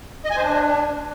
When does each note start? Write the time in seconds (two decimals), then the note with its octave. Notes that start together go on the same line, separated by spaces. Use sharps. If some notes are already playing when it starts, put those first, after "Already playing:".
0.25 D#5
0.31 G#5
0.37 C5
0.43 D4